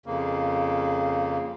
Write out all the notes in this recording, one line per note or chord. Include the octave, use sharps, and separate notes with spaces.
F2 C#3 A#3